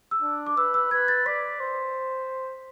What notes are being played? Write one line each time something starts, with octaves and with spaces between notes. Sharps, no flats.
E6
D4
D6
B4 E6
E6
B4 G#6
A6
D5 B6
C5